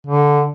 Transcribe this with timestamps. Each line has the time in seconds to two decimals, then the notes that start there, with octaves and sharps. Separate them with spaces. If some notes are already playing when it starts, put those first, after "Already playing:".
0.07 D3